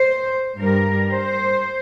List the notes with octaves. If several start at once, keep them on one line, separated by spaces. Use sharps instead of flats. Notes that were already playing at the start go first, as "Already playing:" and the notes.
Already playing: C5
G2 G3 A#4
C5